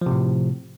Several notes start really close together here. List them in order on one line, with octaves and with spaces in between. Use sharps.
F3 C3 A2